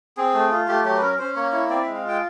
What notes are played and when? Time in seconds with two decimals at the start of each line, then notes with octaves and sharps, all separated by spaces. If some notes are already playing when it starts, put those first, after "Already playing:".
0.17 C4 G#4
0.34 A3
0.51 F4
0.68 A3 G4
0.84 F#3 G4
0.97 B4
1.02 C#4 A#4
1.19 C#4 C5
1.36 A#3 C#5
1.52 E4 C#5
1.70 C4 D5
1.82 E5
1.86 G#3
1.95 F5
2.04 F4 G5